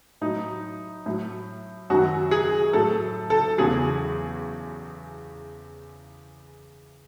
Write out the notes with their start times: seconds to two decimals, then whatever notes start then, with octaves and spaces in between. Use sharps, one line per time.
0.21 A2 F#3 D#4
1.06 A2 F#3
1.90 F#2 D#3 F#3 F#4
2.31 G#4
2.73 A2 F#3 A4
3.30 A4
3.58 E2 C#3 F#3 G#4